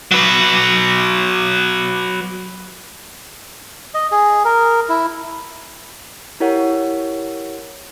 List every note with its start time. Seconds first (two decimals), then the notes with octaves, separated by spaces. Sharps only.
0.11 F#3 B4
3.94 D#5
4.12 G#4
4.45 A#4
4.89 E4
6.40 E4 G4 A#4 C#5 F#5